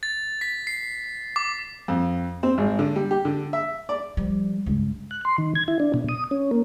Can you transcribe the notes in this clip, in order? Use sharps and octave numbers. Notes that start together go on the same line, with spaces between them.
A6
B6
C7
D6
F2
C4
G#1
D3
G3
G4
D3
E5
D5
F3 G3
C#2 G2
F#6
C6
D#3
G#6
E4
D4
B2
D#6
C#4
A#3